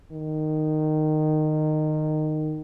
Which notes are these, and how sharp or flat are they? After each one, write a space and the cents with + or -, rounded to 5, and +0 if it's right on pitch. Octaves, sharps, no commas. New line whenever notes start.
D#3 -15